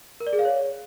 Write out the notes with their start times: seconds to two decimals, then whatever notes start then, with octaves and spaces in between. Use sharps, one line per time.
0.20 A#4
0.27 D5
0.33 G#4
0.39 F5
0.45 C#5